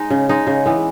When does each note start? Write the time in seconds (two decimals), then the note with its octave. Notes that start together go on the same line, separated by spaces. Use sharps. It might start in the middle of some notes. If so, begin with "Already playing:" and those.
Already playing: G#3 D#4
0.10 C#3
0.29 G#3 D#4
0.47 C#3
0.66 E3 B3